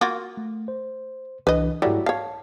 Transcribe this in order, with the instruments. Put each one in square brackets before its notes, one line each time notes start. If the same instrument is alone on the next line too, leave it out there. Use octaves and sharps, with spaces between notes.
[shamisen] A#3 F4 F#4
[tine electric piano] A3
C5
[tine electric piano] C2 E3 D4 [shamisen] B4 D#5
[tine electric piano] G#2 E4 [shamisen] F#3 G3 A3
[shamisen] C#5 F5 [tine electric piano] A5